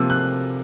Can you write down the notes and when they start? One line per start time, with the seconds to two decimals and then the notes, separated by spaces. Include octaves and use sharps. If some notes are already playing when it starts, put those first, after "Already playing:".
Already playing: C3 F3 A#3 E6
0.10 F#6